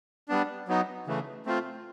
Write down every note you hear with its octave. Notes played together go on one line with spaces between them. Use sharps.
G3 B3 D4
F#3 B3 D#4
C#3 E3 A3
A3 C4 F4